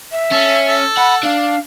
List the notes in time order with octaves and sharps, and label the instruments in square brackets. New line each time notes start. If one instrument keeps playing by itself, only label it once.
[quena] E5
[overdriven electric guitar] C#4 [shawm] A4
[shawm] A4
[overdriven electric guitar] F#5 [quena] B5
[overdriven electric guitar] D4 [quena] F5